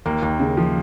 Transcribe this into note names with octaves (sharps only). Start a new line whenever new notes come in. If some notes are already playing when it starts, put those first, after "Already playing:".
D#2 A#3
D#2
C#3
F3